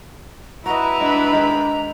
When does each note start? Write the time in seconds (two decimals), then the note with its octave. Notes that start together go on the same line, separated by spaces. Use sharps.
0.66 E4 F#4 B4 D#5 A#5
1.01 G#3 D4 B5
1.32 D#3 G#3